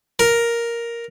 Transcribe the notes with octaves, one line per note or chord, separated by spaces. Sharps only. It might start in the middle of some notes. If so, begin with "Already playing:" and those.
A#4